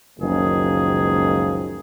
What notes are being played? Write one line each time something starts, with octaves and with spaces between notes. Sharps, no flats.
F#1 C#2 D#3 F3 G#3 G#4